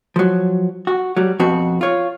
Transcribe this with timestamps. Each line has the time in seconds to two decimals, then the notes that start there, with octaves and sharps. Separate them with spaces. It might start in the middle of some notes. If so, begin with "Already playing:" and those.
0.16 F3 F#3
0.87 F#4
1.17 F#3 G3
1.40 F2 B2 C4 F#4
1.81 F4 C#5